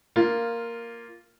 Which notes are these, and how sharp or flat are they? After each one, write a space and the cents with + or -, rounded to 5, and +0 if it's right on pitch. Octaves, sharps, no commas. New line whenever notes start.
A#3 +0 F4 -5